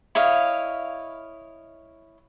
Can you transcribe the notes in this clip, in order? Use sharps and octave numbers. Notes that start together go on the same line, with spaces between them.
E4 C#5 D#5 F5